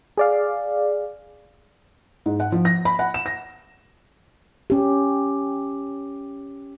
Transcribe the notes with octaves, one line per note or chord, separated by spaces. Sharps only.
G#4 D5 F5
G#2
F#5
F3
A#6
B5
F#5
E7
A#6
C#4 G4